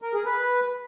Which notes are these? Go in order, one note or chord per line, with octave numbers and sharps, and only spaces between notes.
A#4
G#4
B4